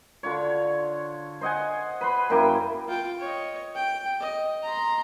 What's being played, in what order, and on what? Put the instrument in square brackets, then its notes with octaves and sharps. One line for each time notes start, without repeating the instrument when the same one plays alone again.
[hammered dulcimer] D3 F4 C#5
C5 D#5 F#5 G#5
B4 B5 C6
F#2 A#3 E4 G5
[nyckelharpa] F4 G5
C#5 D#5
G5
D#5
A#5 C6